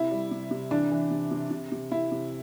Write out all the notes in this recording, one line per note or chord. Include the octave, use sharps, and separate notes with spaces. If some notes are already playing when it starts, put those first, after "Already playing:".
Already playing: C3 E4
G3
C3
C3
E3 D4
E3
C3
C3
C3
C3
C3 E4
C3